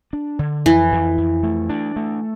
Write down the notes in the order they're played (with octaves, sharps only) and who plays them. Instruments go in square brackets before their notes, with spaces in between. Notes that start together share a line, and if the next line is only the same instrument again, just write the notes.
[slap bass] D4
D3
[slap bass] F2 [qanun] E3
[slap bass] F2
F2
A3
D4
A3